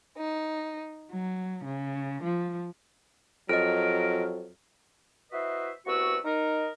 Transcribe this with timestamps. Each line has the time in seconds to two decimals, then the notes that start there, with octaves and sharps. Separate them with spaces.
0.16 D#4
1.10 F#3
1.64 C#3
2.22 F3
3.49 F2 F#3 A#4 D#5 F6
5.32 E4 F#4 B4 C5 D#5 E5
5.87 C2 B3 F#4 B4 C#6 E6
6.25 D#4 A#4